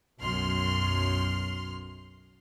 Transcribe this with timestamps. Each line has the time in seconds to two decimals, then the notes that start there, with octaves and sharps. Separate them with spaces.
0.20 B1 F#2 C6 F6